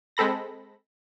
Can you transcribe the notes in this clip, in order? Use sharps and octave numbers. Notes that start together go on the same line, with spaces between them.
G#3 C4 A4 B5 A#6